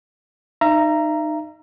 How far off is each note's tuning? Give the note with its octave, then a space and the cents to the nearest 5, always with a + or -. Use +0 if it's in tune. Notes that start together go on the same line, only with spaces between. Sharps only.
D#4 -25 E5 +45 A#5 +0